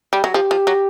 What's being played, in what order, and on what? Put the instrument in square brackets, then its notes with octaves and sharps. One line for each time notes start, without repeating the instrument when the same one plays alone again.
[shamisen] G3
F#3
[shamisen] F3 [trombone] G4
[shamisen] F3
F#3